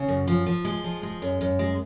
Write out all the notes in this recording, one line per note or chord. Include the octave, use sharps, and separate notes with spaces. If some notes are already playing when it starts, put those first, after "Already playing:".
Already playing: C#3
F#2
F3
F3
G#3
F3
G#3
F#2
F#2
G#3